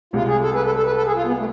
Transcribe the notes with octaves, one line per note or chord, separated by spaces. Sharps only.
C2 C3 G#3 F4
G#4
A4
B4
A4
A4
B4
A4
G#4
F4
B3
A3